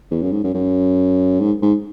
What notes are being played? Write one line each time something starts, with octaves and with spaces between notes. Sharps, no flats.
E2
F#2
G#2
F#2
F#2
G#2
G#2